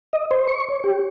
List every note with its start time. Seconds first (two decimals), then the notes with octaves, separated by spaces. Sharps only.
0.13 D#5
0.31 C5
0.47 C#6
0.69 C#5
0.84 G4